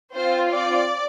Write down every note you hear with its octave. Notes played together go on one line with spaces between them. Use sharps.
C4 F4 C5
D5